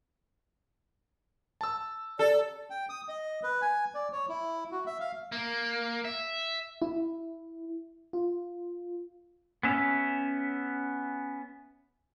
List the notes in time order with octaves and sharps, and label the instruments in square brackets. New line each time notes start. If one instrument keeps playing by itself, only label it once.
[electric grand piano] A5 E6
[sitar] A4 [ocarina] D5
[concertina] G5
D#6
D#5
B4
G#5
D5
C#5
E4
F#4
E5
F5
[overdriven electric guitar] A#3
E5
[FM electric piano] E4
F4
[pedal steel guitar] B3 C#4 E5